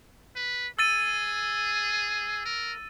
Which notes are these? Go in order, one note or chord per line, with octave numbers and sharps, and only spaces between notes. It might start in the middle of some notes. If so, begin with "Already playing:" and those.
B4
G#4 E6 A6 D#7
A#4